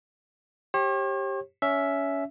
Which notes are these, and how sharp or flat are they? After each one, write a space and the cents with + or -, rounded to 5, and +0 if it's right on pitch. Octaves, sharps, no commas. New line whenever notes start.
G4 +0 C#5 -45
C#4 +20 E5 +0